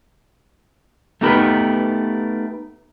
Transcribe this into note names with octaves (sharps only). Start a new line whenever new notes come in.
A3 B3 D#4 G4 A#4 B4